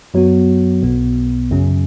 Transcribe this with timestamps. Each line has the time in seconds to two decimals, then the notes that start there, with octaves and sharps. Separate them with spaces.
0.14 F#2 F#3 B3 F#4
0.82 B1 B2 B3
1.51 F#2 C#3 F#3 C#4